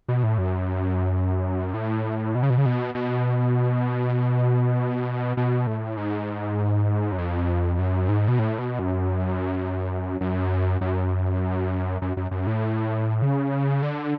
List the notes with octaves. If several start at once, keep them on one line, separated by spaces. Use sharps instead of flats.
B2
A2
F#2
A2
B2
C#3
B2
C#3
B2
B2
B2
A2
G#2
F#2
F2
F#2
G#2
B2
A2
B2
F#2
F#2
F#2
F#2
F#2
F#2
A2
C#3
D3